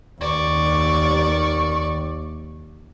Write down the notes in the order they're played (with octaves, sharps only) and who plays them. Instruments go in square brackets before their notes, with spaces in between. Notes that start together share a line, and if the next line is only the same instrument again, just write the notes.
[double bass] D#2 [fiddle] D5 C#6